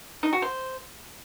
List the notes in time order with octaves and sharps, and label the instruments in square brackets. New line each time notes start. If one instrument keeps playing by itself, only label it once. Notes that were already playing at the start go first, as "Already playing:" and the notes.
[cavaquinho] D#4
F#4
C5